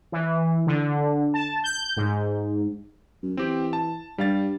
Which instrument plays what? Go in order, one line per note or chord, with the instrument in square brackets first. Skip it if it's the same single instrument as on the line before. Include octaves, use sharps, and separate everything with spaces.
[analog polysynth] E3
D3
A5
G6
G#2
[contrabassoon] F#2
[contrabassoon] E3 [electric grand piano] C4 G4
[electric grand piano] A5
[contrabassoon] G2 [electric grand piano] G3 F5 A6